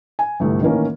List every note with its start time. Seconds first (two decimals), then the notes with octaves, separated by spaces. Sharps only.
0.19 G#5
0.40 G1 C2 A3
0.61 A2 D#3 E3 A#3 C#4